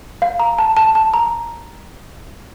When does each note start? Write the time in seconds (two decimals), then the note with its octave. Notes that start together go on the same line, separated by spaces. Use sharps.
0.22 F5
0.39 A#5
0.58 A5
0.77 A5
0.95 A5
1.14 A#5